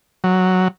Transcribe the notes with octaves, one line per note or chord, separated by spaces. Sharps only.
F#3